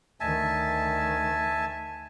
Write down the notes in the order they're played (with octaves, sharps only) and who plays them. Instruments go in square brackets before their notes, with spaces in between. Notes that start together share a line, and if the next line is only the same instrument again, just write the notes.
[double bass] D2 D#3 [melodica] E5 G#5 A5